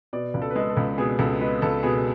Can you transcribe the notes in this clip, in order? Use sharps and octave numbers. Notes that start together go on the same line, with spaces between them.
B2 D5
C#2
A4
B4
G#3 A4
A4
C#2
B2 G#4
C#2 A4
G#3 B4
C#2 A4
B2 G#4